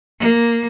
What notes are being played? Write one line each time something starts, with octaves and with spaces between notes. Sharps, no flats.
A#3